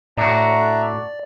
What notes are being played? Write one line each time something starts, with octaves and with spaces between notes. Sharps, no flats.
A2 D4 F#4 D5 E5 A#5